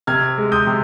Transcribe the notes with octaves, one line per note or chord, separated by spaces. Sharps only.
C3 F6 G#6
G#3
D#6 G6
C3